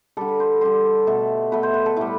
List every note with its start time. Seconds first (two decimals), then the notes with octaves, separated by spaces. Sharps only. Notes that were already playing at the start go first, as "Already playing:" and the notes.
0.17 D3 G3 A4
0.28 B4
0.40 C5
0.61 D3 G3 C5
1.07 B2 A3 A4
1.52 B2 A3 B4
1.63 C5
1.74 B4
1.86 A4
1.96 A2 G3 E4